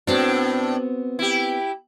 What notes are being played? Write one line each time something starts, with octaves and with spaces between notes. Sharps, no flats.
A2 B3 C4 D4 F#4
E4 G4